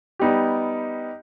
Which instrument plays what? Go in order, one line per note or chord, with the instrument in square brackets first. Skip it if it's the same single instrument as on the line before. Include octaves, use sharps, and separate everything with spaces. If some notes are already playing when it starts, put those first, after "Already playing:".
[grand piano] G3 B3 D#4 G4